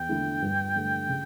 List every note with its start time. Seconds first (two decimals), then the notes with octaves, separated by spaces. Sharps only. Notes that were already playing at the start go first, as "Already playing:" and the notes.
Already playing: E2 G5
0.09 D3 A3 E4
0.42 G2
0.76 D3 A3
1.09 C#3